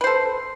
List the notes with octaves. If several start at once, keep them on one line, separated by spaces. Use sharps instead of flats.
A4 B4 C5